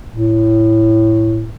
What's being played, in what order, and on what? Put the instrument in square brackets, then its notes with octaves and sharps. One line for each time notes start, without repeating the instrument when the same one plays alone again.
[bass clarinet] A2